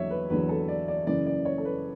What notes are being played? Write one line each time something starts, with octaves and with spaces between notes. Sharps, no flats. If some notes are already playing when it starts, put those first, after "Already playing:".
Already playing: E2 D3 F#3 C#5 E5
B4
E2 D3 F#3 B4
A4
D5
D5
F#2 C#3 E3 D5
D5
C#5
A4
B4